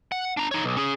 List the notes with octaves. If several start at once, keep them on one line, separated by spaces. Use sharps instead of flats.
F#5
D4 A#5
D#4 C#5
B1
C#4 G#4